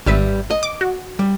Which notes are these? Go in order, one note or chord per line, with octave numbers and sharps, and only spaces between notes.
G#1 G3 B4 E5
D#5
D6
F#4
G3